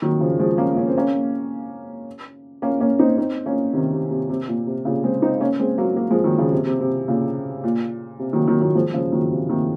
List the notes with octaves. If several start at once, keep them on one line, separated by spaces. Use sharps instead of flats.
D#3 F#3
C#3 F3
F3 G#3
A#3 C#4
C#4
C4
A#3 C#4
A#3 C#4
A#3 C#4
C4 D#4
C4 D#4
A#3 C#4
C3 D#3
C3
C3
C3
A#2
C3
A#2 C#3
G#3 C4
C4 D#4
A#3 C#4
G#3 C4
F#3 A#3
F#3 A#3
F3 G#3
D#3 F#3
C#3 F3
C3
C3
C3
A#2 C#3
A#2
C3
D#3 F#3
D#3 F#3
D#3 F#3
F3 G#3
C#3 F3
D#3 F#3
C3
C3 D#3